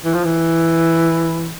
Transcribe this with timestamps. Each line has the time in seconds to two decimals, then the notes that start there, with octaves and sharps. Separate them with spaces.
0.05 E3
0.14 F3
0.24 E3